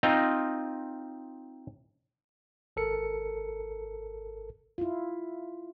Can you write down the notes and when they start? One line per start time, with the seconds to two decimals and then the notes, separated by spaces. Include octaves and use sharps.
0.03 C4 D#4 F4 D#5 F5
2.76 G#1 A4 A#4 C#7
4.78 E4 F4